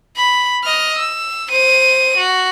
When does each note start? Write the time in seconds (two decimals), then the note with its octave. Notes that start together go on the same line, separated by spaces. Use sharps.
0.17 B5
0.64 D#5 F6
0.98 E6
1.50 C5 D#7
2.17 F#4